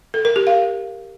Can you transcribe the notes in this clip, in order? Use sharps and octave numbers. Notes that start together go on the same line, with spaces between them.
A4
A#4
G4
F5